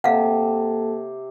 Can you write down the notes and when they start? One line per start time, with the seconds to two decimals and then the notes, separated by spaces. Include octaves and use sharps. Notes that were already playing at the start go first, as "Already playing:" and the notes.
0.04 C3 A#3 A4 F5 F#5 A5